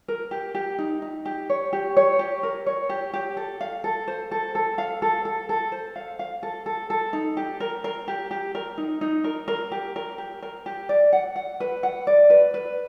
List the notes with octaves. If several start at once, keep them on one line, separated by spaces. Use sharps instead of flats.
A#4
G4
G4
D#4
D#4
G4
C#5
G4
C#5
G4
A#4
C#5
G4
G4
A4
F5
A4
C5
A4
A4
F5
A4
A4
A4
C5
F5
F5
A4
A4
A4
D#4
G4
A#4
A#4
G4
G4
A#4
D#4
D#4
A#4
A#4
G4
A#4
G4
A#4
G4
D5
F#5
F#5
B4
F#5
D5
B4
B4